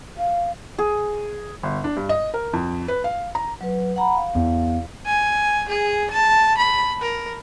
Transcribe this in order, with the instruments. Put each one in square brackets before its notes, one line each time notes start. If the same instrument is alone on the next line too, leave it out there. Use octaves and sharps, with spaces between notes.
[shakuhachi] F5
[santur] G#4
[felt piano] G1
D4
G2
D#5
A#4
F2
B4
F5
A#5
[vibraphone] F#3 B4
F#5 A#5 B5
F5
[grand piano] E2
[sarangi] G#5
G#4
A5
B5
A#4